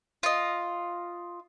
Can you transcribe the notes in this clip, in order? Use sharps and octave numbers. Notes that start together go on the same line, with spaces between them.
F4 D#5